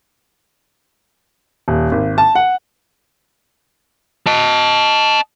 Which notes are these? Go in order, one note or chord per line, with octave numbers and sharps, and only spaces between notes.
D#1
G#1
A5
F#5
D#5 A5